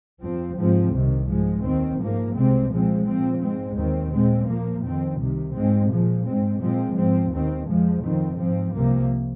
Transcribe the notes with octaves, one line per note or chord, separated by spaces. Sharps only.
F2 F3 C4
G#2 F3 G#3 C4
C2 C3 D#3
G#2 F3 G#3
D#2 D#3 C4
G#2 F3 A#3
C2 C3 G#3 C4
A#2 F3 G#3 C4
A#2 F3 C4
G#2 G#3 C4
D#2 D#3 C4
A#2 G#3 C4
A#2 F3 A#3
F2 D#3 C4
C2 C3 D#3
G#2 G#3 C4
A#2 F3 G#3
G#2 G#3 C4
A#2 F3 G#3 C4
G#2 F3 C4
D#2 D#3 C4
F2 F3 G#3
F2 D#3 C4
G#2 F3 C4
C2 C3 F3 A#3